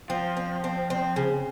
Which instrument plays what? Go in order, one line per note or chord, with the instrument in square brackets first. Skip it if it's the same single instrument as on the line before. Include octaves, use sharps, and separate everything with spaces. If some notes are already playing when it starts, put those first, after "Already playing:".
[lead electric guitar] F3 [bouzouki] C4
[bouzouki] C4
C4
C4
C#3